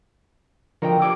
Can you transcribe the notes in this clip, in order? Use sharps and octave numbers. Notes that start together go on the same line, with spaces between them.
D3 F3 F#4 A#4 D#5 G5
E3 G3 A#3 D6